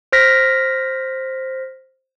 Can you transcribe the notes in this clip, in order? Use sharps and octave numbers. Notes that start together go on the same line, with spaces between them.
C5 F6 A#6 B6